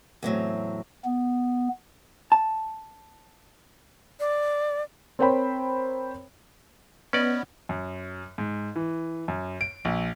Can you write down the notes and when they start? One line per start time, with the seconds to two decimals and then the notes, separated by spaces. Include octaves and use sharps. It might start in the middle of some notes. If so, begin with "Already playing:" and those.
0.23 E2 A2 F#3 C4
1.04 B3
2.32 A5
4.20 D5
5.19 C4 A#4 C5 C#5 G5 B5
7.13 B3 C#4 D5 D#5
7.69 F#2
8.38 G#2
8.76 E3
9.28 F#2
9.61 D7
9.85 A#1